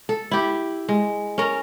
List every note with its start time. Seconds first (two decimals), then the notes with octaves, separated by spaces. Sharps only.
0.09 A4
0.31 E4 G4
0.89 G#3
1.38 C#4 A#4